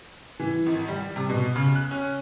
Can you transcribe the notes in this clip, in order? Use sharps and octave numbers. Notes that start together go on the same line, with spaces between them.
E3
G#1
G3
C3
B2
C#3
F#6
C#4